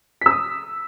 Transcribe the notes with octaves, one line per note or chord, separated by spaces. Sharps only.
D#6 E6 B6